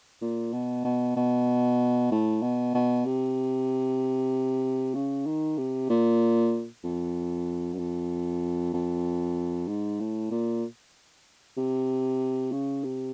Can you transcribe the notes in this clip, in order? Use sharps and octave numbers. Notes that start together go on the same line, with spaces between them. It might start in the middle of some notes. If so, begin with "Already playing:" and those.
A#2
B2
B2
B2
A2
B2
B2
C3
C#3
D#3
C3
A#2
F2
F#2
F2
F2
G#2
A2
A#2
C3
C#3
C3